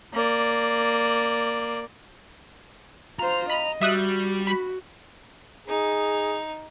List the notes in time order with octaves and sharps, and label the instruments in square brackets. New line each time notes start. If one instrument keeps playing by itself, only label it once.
[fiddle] A#3 D5
[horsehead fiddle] F4 C5 [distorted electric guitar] A#5
[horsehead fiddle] D#5 [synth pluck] B5
[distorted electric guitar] G3 [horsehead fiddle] F#4 [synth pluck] E5 D#6 F#6
[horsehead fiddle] F#4 [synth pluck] B5
[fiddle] D#4 [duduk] G#4